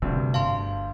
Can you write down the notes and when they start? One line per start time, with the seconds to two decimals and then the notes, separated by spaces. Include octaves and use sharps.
0.02 D2 G2 C3
0.34 G1 F5 A5 C6